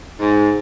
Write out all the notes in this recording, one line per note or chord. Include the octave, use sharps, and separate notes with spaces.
G#2